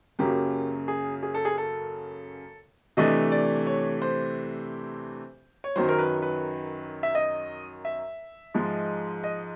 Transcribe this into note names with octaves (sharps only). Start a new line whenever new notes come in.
F#2 C#3 F#3 A#3 G4
G#4
G#4
A4
G#4
A4
C3 E3 A3 D4 D#5
D5
C#5
C5
C#5
F#2 D#3 F#3 C5
A#4
B4
B4
E5
D#5
E5
G#2 F3 G#3
D#5